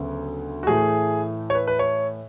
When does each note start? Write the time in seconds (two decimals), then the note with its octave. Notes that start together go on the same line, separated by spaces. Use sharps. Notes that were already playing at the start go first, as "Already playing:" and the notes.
Already playing: D2 C#3 F#3 B3
0.63 F#4
0.67 A2 E3 A3 G#4
1.50 C#5
1.55 B4
1.67 B4
1.79 C#5